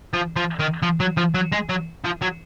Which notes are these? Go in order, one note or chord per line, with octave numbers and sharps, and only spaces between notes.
F3
F3
D#3
F3
F#3
F3
F#3
G#3
F#3
F3
F#3